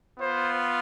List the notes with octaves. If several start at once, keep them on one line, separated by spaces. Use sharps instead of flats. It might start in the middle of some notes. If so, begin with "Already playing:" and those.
B3 F4 C5